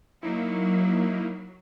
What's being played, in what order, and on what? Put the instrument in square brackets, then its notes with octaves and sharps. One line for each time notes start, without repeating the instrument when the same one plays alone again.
[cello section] F#3 [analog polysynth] A#3 D#4 E4